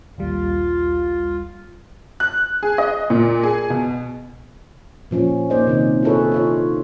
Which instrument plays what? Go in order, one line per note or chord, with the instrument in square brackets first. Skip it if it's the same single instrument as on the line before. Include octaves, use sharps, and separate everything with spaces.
[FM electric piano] A#1 D#2 G3 [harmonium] F4
[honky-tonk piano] F#6
G#4
D#5
A#2
G#4
B2
[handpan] A#2 F3 C#4
A#3 D#4 G#4 C5 D5 D#5
C3 D#3
E4 F4 G#4 A4 B4 C#5
D#4 F4 C#5